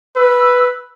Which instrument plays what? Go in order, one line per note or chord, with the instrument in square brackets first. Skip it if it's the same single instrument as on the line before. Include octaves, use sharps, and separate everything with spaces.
[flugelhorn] B4 [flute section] E6